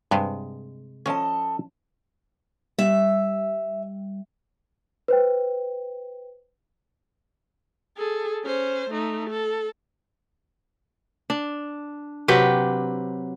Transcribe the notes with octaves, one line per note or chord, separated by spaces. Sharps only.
G2 C3 G#3 B4 C5
F3 C#4 A4 D#5 A5
G3 E5
B4 C5 G5
G#4 A4
C#4 C5
A3 D#4
A4
D4
C3 F#3 G4 B4